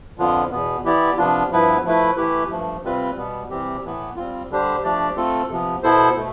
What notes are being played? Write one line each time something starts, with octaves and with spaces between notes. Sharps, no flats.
F2 D3 F3 B3 F4
E2 B2 B3
E3 B3 E4 G4 D5
C3 F3 B3 D4 F4
G2 F3 B3 E4 B4
F3 A3 E4 B4
E3 A3 E4 G4 B4
G2 F3 A3
C3 G3 C4 F4 B4
B2 G3 B3
C3 E3 G3 C4 G4
A2 E3 B3
G3 C4 F4
D3 G3 D4 G4 C5
F3 A3 D4 G4 D5
A3 C4 F4 A4
C3 F3 B3
B2 B3 E4 A4 C5
B2 A3